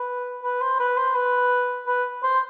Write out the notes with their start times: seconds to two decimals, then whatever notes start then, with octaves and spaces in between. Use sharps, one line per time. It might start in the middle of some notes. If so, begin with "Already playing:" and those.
Already playing: B4
0.43 B4
0.62 C5
0.80 B4
0.97 C5
1.15 B4
1.87 B4
2.23 C5